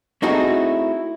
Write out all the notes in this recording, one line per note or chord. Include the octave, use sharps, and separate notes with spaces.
A3 C4 D#4 E4 F#4 G#4